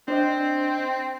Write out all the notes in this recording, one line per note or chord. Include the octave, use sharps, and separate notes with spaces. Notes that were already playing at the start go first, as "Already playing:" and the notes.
C4 D4 C5 D#5